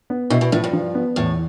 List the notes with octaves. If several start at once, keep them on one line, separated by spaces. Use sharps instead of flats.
B3
B2 E4
B2
A2 F3
G2
F3
B3
E2 A2